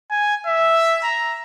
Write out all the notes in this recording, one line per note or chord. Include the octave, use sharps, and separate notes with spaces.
G#5
E5
A#5